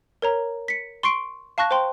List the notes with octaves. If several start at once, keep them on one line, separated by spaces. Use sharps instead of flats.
A#4 C#5 A#5
B6 C#7
C6 C#6 C7 D7
F5 A5 C#6 F#6 A#6
C5 G5 C6